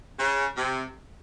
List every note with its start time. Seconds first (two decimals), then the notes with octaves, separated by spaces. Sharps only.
0.19 C#3
0.57 C3